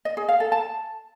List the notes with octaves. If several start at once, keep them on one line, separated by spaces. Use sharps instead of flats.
D#5
G#4
F5
A4
A5